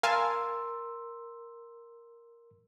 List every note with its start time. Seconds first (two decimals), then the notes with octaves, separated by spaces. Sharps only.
0.03 A#4 F5 G#5 A5 C6 E6